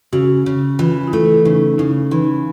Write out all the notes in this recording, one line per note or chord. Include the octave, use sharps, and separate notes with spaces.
C#3 F#4
C#3
E3 F4
F4
A3 E4
E4
C#3 D#4
D#4
C#3 E4
E3 D#4